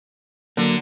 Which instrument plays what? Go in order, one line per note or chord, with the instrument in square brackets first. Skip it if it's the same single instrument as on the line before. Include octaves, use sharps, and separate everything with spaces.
[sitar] D3 [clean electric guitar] F#3 A#3